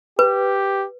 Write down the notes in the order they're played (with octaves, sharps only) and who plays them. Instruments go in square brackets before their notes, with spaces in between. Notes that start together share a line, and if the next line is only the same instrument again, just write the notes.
[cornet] G4 [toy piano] B4